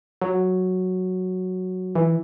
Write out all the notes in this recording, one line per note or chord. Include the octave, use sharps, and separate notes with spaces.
F#3
E3